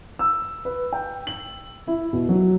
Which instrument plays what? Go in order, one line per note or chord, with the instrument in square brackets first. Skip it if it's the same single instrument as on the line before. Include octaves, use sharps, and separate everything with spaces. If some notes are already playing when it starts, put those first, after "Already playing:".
[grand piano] E6
B4
G5
F#7
E4
B2
F#3